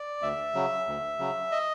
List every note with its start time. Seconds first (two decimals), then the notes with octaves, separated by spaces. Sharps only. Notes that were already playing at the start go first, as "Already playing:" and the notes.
Already playing: D5
0.22 D2 E5
0.54 C#3 F#3
0.87 D2
1.19 C#3 F#3
1.52 D#5